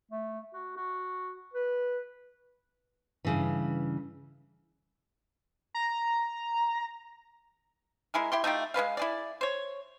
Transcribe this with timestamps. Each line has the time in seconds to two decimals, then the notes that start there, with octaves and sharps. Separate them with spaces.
0.12 A3
0.54 F#4
0.77 F#4
1.54 B4
3.25 G2 C#3 E3
5.75 A#5
8.14 G#3 E4 G#4 A#4
8.32 E4 G4 C6
8.44 A3 D#4 F4 G4
8.74 G#3 C#4 B4 F5
8.97 E4 G#4 D5
9.41 C5 C#5